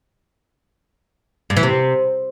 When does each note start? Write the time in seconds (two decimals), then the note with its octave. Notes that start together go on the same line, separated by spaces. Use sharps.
1.50 G2
1.57 E3
1.63 C3